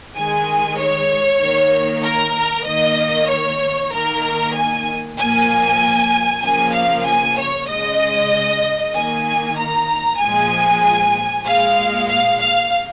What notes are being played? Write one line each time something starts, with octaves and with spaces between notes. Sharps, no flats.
D#3 G#3 G#5
C#5
D#3 A#3
A#4
D#3 A#3 D#5
C#5
D#3 A#3 A#4
G#5
A#2 F3 A#3 G#5
C#3 F3 A#3 G#5
F5
G#5
C#5
C#3 G#3 D#5
D#3 A#3 G#5
A#5
A#2 F3 G#3 G#5
A#2 G#3 F5
F5
F5